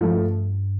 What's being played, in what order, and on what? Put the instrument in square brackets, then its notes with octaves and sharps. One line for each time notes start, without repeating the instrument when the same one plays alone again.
[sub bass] G2 [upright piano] F3 A3